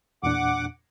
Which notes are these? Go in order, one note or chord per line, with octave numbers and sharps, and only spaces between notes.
E2 A#2 D4 F#5 D6